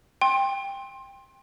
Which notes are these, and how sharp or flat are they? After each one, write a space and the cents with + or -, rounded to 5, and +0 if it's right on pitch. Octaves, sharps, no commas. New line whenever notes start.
G5 +15 C6 +20